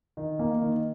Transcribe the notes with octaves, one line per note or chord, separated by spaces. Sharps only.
D#3
A#3
D#3